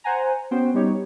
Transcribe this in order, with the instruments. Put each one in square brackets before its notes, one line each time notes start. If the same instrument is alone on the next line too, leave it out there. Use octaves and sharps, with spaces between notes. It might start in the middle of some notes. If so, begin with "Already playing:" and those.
[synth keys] C5 F#5 G#5 A#5
B3 C#4 F#4 C5 G5
G3 B3 D#4 G4 C#5